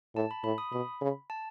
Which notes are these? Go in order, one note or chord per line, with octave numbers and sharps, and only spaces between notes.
A2 A5
B5
A2 B5
D#6
B2 B5
C#3
A5